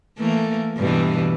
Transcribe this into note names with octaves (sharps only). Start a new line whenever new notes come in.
E3 A3 A#3
G2 B2 E3